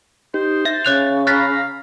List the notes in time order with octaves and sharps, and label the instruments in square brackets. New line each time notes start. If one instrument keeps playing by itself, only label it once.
[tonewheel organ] D#4 G4 [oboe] C5
[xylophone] E5 [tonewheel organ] A6
[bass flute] C#3 [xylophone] C#5 F#6 F7
[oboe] F5 [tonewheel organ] A#5 B5 [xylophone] F#6 A6 B6